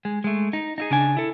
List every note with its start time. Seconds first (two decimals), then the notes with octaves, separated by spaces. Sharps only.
0.05 G#3
0.24 G#3 A3
0.53 D#4
0.78 D#4 E4 G#4
0.91 C#3 D4 G#5
1.17 E4 A4